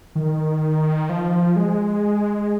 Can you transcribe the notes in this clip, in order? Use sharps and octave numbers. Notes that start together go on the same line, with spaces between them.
D#3
F3
G#3